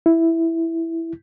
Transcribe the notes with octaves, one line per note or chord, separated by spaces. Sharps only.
E4